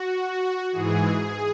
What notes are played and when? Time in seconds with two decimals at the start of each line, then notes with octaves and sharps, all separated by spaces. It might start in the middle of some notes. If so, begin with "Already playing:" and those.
Already playing: F#4
0.72 G#2 E3 G#4
1.19 G#4